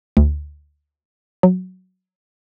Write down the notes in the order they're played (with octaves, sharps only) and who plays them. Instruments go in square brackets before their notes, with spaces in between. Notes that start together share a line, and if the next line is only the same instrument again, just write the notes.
[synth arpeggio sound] D2
F#3